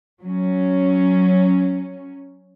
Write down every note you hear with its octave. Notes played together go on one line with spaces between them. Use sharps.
F#3 C#4